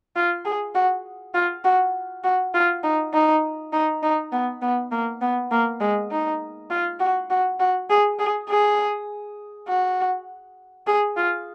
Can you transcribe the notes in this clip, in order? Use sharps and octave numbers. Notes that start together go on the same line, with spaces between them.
F4
G#4
F#4
F4
F#4
F#4
F4
D#4
D#4
D#4
D#4
B3
B3
A#3
B3
A#3
G#3
D#4
F4
F#4
F#4
F#4
G#4
G#4
G#4
F#4
G#4
F4